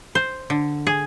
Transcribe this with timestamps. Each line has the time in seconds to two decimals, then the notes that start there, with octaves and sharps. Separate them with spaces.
0.15 C5
0.50 D3
0.87 G#4